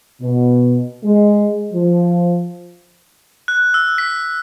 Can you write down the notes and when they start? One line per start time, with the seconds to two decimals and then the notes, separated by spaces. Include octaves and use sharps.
0.22 B2
1.04 G#3
1.72 F3
3.48 F#6
3.74 E6
3.98 B6